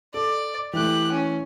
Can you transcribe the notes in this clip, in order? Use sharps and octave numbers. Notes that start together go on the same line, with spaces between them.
A4 D5
E3 A3 G4 F#6
C#4